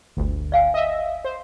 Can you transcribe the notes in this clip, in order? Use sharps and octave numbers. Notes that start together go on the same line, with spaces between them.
G1 D2
D5 F5 G#5
D#5 E5
C5